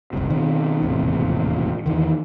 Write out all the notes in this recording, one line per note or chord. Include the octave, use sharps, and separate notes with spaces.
F#1 C2 C3
B2 D#3 C4
E1 A1 D#2 C3
E2 D#3 E3